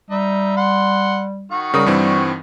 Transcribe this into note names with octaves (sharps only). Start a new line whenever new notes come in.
G3 D#4 E5
F#5 C6
D#3 F#4 C#6
C#3 G3 A#4 D#6
G2 E3 C4